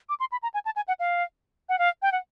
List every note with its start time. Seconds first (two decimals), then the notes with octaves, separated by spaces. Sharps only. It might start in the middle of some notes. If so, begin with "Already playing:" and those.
0.09 D6
0.20 C6
0.32 B5
0.43 A#5
0.54 G#5
0.65 A5
0.76 G#5
0.88 F#5
1.00 F5
1.69 F#5
1.79 F5
2.02 G5
2.12 F#5